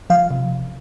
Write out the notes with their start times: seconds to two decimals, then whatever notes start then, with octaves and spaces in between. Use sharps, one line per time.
0.10 F3 F5
0.31 C3